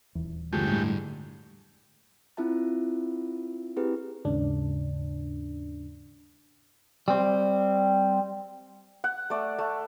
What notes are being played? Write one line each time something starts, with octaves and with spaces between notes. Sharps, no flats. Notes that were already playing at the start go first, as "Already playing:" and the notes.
D#1 E2
G2 D3 F3 G#3 A3 G4
A2
C4 E4 F4 E5 A5
C4 E4 G4 G#4 B4
D#2 G#2 C#3 D4
G3 C4
F#5
A3 D5
A3